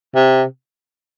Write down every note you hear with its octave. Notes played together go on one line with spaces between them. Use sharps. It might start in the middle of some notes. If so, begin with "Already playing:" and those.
C3